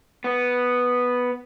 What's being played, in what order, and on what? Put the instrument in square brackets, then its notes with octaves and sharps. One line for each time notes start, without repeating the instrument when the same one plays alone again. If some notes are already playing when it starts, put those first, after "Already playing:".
[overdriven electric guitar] B3